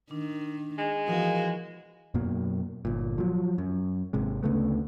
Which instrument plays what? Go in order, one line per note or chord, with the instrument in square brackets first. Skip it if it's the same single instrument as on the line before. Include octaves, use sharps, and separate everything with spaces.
[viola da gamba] D#3 [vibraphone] D4
[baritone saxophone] G#3
[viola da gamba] E3 F#4 [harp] F3 B3 G#4 [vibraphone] A#4 F5
[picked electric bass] F#2 B2 F#3 A#3
G1 A#2
F3 F#3
F#2
G#1 C3 G#3
D2 C#3 A3 B3